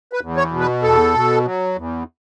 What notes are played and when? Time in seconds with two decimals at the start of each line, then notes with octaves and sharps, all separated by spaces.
0.13 B4
0.21 E2
0.37 C#5
0.51 B2
0.60 B4
0.82 E2 A4
1.14 B2
1.45 F#3
1.76 E2